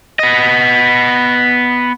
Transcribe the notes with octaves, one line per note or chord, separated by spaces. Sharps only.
B3 D#5